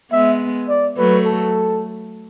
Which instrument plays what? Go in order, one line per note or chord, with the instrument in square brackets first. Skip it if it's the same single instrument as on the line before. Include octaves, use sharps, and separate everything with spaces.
[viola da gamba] G#3 B3 [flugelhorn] E5
[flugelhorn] D5
[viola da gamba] F#3 A3 [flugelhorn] B4
[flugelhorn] A4